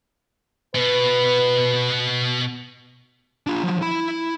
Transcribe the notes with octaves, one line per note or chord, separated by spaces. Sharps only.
B2 B3 B4
D4 F4
F3 F#3
E4 B5